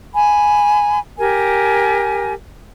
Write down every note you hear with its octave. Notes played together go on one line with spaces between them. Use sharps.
G#5 B5
G4 A#4 G#5